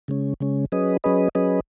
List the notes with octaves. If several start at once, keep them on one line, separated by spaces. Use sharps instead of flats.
C#3 G#3 C#4
C#3 G#3 C#4
F#3 C#4 G#4 B4 D#5
F#3 C#4 G#4 B4 D#5
F#3 C#4 G#4 B4 D#5